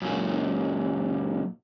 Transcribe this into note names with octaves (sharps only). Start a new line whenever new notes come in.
F#2 A#2